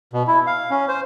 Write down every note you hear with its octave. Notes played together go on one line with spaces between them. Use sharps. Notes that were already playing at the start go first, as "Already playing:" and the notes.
B2
E4
F5
C#4
C5